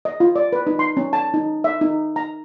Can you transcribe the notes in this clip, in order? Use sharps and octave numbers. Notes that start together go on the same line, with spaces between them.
D#5
F4
D5
B4
D#4
C6
C#4
A5
D#4
E5
D#4
A#5